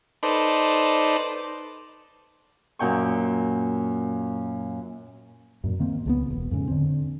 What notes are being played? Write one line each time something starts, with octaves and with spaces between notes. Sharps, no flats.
D#4 A4 B4 C5 D5
F#2 A#2 G5 C#6
F#2 A#2
D#3 A#3 C4
C#2 A3 B3
E1
F2 G#2 C#3
D3 C4